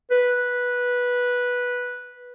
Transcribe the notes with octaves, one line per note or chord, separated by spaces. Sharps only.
B4